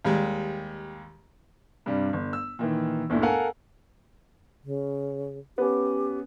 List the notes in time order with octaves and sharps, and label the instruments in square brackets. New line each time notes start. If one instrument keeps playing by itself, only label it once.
[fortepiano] D#2 G3 G#3
[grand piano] G2 C3 G3
G1
E6
A#2 D#3 E3
G1 D2 A#2 E4
A4 A#4 F5 F#5 G#5
[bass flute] C#3
[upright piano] B3 C#4 [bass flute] G4